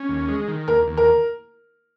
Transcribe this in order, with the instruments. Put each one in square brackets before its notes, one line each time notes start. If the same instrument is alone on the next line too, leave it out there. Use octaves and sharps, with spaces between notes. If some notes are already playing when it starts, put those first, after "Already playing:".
Already playing: [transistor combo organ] C#4
D#2
G#3
D#3
[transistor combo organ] D#2 [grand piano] A#4
[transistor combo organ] D#2
[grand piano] A#4